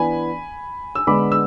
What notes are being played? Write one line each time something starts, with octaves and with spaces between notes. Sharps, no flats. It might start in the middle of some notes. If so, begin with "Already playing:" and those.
Already playing: E3 B3 D4 G#5 B5
E6
D3 G#3 B3 D4 B5 D6
E6